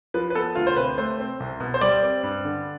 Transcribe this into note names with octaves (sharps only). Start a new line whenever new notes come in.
F3 B4
B4
B3 A4
D2 F4
C5
C3 B4
A3 C5
C4
C2
B2
C5
G3 D5
C4
G2
D3